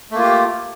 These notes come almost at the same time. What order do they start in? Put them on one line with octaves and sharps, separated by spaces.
A3 A#3 F4 G4